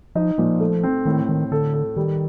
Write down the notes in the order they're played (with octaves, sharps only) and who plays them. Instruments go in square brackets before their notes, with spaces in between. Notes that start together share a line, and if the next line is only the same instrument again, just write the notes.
[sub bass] F3 [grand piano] D#4
[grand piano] A#2 [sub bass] F3
[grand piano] A3
C4
[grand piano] A2 [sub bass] D#3
[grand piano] A2 [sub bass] D#3
[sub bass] D3 [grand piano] A4
[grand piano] A4
[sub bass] D#3 [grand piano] G3